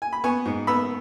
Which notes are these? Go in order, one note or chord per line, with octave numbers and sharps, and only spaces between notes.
G#5
B5
B3 G#5 C#6
G#2
B3 B5 E6